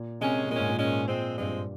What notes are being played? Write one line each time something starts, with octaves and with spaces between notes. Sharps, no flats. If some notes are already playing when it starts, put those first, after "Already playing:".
Already playing: A#2
C3 D#3 G#3 C#4
C3
A#2 D#3 G#3 C#4
G#2
A#2
D#3 G#3 C#4
F3 G#3 C4
G2 F3 G#3 C4